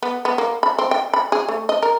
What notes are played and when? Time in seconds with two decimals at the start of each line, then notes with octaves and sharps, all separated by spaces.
0.03 B3
0.25 B3
0.38 A#3
0.63 B5
0.78 C4
0.91 G5
1.13 B5
1.32 G#4
1.48 A3
1.69 D#5
1.82 A#4